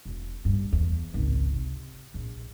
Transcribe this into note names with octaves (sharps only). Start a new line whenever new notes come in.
E1
G2
E2
G#1 C#2
C3
A#1